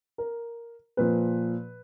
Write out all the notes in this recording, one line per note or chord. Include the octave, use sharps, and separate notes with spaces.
A#4
A#2 F3 B4